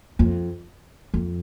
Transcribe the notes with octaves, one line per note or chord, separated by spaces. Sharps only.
F2
F2